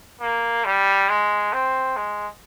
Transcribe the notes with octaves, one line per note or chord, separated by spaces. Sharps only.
A#3
G3
G#3
C4
G#3